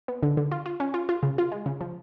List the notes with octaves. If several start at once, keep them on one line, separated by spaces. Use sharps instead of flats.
B3
D3
D3
F4
F4
C#4
F4
F4
C#3
F4
G#3
C#3
F3